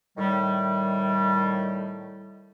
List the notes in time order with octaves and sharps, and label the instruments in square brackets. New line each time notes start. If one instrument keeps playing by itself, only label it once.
[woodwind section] A2 D#3 G3